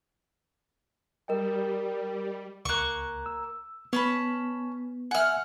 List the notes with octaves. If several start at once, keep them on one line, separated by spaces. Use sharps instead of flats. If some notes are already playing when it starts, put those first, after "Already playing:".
G3 A#4 D#5 G5
C#2 A#3 C#6 F#6
E6
B3 C#4 A5 B5
E5 F#5 G#5 F6